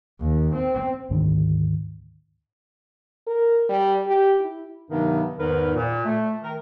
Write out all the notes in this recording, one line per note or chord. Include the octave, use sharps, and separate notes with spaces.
D#2
C4
D2 G#2 D#3 D4
A#4
G3
G4
E4
G2 C3 D#3 F#3 B3 D#4
E2 G#2 D#3 D#4 A#4 B4
A#2
A3
D#3 A#4